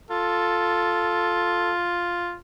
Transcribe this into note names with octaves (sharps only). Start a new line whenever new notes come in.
F4 A4